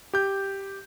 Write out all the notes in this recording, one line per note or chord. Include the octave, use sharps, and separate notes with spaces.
G4 G6